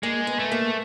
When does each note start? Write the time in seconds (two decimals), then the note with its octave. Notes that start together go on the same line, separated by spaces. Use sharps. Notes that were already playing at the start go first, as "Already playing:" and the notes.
0.03 G#3 A#3
0.27 B3
0.39 A3
0.52 A#3